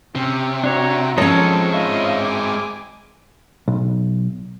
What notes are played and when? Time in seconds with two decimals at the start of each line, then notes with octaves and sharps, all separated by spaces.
0.16 C3 C#4 G4
0.64 D4 F#4 C#5 A#5
1.18 F3 G#3 C4 C#4 A4 C#5 D#5
1.73 F4 D#5 E5
2.21 G#5 D6
3.68 B1